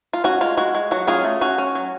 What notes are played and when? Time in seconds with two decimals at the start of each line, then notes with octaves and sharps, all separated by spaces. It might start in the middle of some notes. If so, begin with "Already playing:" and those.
0.13 F4
0.24 C#4 F#4
0.41 G#3 F4
0.57 G#3 F#4
0.75 G#3
0.91 F#3 F#4
1.07 C#4 F4 G#4
1.24 A3
1.41 C#4 F#4
1.58 C#4
1.75 F#3